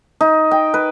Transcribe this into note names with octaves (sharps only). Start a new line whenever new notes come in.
D#4
G5
B4